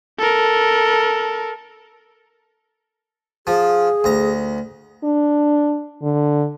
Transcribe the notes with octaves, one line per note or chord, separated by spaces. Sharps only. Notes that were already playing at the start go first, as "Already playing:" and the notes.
A4 A#4
F3 G#4
D2 A#5
D4
D3